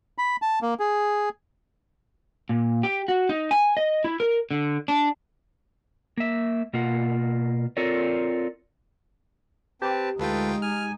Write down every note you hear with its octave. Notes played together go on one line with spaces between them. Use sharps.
B5
A5
A#3
G#4
A#2
G4
F#4
D#4
G#5
D#5
E4
A#4
D3
D4
A#3 E5
B2 A#3 F4 F#5
C4 F4 A4 A#4 C#5 D5
C4 G4 B4 A5
D2 G#3 D#4 F4 A4 B4 G5
G#5 F6